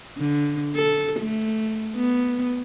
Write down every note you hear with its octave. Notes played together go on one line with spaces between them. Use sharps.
D3
A4
A3
B3